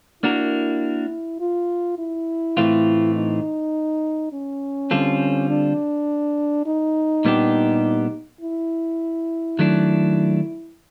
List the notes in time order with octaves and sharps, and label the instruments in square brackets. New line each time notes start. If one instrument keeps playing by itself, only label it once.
[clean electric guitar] A#3 D4 F#4 A#4 [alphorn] E4
[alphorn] F4
E4
[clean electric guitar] A2 E3 A3 C4 F4
[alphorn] D#4
C#4
[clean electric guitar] D3 G3 C4 F4 A4
[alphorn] D4
D#4
[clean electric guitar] A#2 G3 B3 D4 G4
[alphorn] E4
[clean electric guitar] D#3 F#3 A3 D4